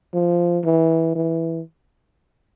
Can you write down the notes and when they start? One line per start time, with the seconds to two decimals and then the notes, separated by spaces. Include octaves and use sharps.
0.14 F3
0.65 E3
1.15 E3